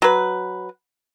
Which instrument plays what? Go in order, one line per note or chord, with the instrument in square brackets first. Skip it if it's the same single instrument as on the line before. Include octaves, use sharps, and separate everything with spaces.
[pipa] F#3 B4